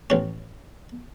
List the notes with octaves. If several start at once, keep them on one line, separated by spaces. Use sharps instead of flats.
A1 C#4